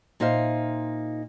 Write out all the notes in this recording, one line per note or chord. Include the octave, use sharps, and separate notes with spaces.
A#2 D#4 C5 E5 F5